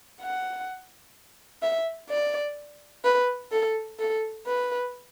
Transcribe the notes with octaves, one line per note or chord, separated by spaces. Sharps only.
F#5
E5
D5
B4
A4
A4
B4